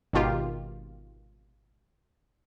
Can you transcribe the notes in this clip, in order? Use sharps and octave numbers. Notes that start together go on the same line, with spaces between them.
G#1 B2 D#3 F4 G4